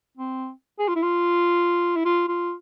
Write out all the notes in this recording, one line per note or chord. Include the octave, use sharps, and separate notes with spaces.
C4
G#4
F4
E4
F4
E4
F4
F4